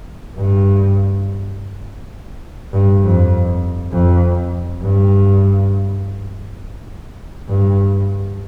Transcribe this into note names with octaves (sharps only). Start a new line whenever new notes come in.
G2
G2
F2
F2
G2
G2